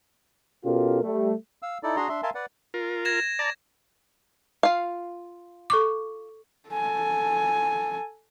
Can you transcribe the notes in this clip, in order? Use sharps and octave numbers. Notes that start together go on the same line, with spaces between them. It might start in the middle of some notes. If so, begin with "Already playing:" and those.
B2 C#4 F4 G4 A4 A#4
G3 A3
F5 E6
D#4 E4 A4 D5
D4 F#4 G#4 A#5 C6
D4 E5 C6
A#4 E5 F5 G#5 A5 C6
B4 D5 F#5
F4 A#4
G#6 A#6 E7
D5 A5 A#5
F4 F5
A4 C#6 D6
A4 G#5